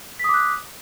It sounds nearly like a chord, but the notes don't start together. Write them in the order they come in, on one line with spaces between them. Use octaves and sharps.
B6 D#6 D6 F#6